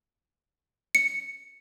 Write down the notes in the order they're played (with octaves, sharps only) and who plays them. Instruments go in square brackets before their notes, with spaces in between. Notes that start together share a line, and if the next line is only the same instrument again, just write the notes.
[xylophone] C#7